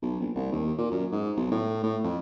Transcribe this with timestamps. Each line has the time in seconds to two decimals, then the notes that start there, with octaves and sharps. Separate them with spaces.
0.02 B1
0.20 A#1
0.35 C2
0.52 D#2
0.78 A#2
0.92 F#2
1.12 G#2
1.37 B1
1.52 A2
1.83 A2
2.04 F2